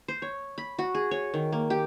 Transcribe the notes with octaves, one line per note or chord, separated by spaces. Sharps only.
C5
C#5
B5
F#4
G#4
C#5
D#3
A#3
G4